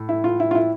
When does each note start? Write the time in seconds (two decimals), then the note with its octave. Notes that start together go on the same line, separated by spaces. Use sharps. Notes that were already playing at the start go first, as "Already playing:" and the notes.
Already playing: A2
0.09 E4
0.24 F4
0.40 E4
0.51 F4
0.55 E4